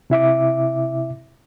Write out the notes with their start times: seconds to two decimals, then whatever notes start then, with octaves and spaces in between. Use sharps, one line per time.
0.10 C3 E4 E5 D6